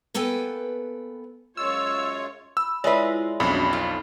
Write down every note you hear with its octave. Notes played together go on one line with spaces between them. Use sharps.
A#3 B3 A4 B4 G5 G#5
F#2 G#3 F4 C#5 E6
B5 E6
G#3 E4 F4 B4 C#5 D5 E5
B1 F2 C#4 D4 F#4 B5
D#4 F4 A4 G#5